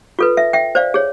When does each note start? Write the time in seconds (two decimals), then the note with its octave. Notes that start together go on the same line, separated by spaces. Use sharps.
0.19 F4 A4 B4
0.37 E5
0.53 E5 G5
0.75 C5 D5 F5
0.94 G#4 C#5